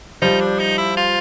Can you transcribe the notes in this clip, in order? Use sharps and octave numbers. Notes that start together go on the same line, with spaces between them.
F3 G3 D#4
D4
D#4
E4
F4